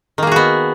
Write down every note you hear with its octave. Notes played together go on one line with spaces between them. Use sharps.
D#3 A#3 B3 F#4 G#4